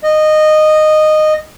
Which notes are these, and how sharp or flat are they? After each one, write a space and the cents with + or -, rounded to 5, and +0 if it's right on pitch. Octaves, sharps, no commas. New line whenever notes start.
D#5 -15